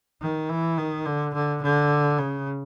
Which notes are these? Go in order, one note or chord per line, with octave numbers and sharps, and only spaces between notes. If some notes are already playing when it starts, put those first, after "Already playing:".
D#3
E3
D#3
D3
D3
D3
C#3